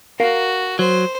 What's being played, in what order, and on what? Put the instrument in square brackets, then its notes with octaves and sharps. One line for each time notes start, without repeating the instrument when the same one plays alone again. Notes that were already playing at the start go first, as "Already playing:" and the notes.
[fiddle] F#4 [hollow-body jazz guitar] A#4 F5
[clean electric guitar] F#3 [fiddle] C5